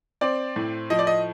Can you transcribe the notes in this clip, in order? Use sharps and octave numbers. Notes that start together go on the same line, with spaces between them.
C4 D5
A2
F3 D#5
D5
D#5